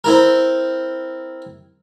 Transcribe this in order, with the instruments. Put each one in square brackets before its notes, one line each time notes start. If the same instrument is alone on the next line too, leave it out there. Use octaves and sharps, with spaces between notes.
[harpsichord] C4 E4 A#4